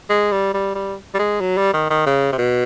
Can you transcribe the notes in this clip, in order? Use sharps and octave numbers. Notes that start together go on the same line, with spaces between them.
G#3
G3
G3
G3
G3
G#3
F#3
G3
D#3
D#3
C#3
C3
B2